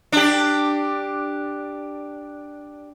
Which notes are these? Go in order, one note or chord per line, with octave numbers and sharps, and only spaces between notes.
D4 G4